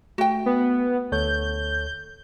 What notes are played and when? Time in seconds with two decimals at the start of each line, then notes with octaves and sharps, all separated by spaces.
0.18 A3 F#4 G5
0.46 B3
1.12 D2 A4 C#5 G6